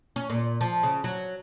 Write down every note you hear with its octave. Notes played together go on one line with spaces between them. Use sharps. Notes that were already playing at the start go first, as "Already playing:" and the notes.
C#4
A#2
F3
C#3
F#3